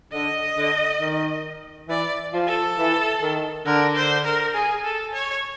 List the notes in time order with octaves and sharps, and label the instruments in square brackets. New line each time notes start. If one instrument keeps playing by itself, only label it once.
[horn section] D3 [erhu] D#5
[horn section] D3
D#3
[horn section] E3 [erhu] D5
[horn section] F3
[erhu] A4
[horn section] E3
D#3
[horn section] D3 [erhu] A#4
[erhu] C5
A#4
G#4
A4
C#5